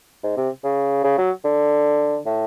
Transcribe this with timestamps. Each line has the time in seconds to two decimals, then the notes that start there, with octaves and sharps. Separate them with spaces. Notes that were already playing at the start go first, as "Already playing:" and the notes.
0.23 G#2
0.37 C3
0.64 C#3
1.04 C#3
1.18 F#3
1.44 D3
2.26 A2